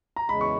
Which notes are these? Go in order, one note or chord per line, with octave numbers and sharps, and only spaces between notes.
A#5
E2 C#3 G#3 B5
C#6